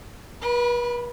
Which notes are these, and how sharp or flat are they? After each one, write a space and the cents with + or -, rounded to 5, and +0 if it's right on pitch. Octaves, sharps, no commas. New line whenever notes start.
B4 -40 B5 +0